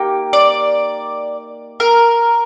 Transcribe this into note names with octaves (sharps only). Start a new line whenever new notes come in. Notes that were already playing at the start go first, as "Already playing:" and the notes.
Already playing: A#3 D#4 G4
D5
A#4